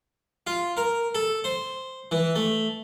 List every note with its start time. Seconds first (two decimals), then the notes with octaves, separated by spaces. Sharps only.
0.47 F4
0.77 A#4
1.15 A4
1.44 C5
2.11 E3
2.35 A3